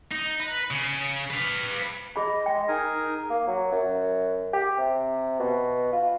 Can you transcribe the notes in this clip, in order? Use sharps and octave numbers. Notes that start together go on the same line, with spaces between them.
D#4
B4
C#3
B4 F5
G#4 D#5 B5
G#3 G5
D#4 G#4 A#4 G#5
A#3
F#3
F#2
G4
C3
B2
F4